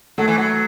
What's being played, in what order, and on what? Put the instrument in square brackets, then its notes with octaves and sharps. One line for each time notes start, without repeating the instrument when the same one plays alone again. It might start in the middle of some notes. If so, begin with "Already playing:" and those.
[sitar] F#3 [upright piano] A3
[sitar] E3
F#3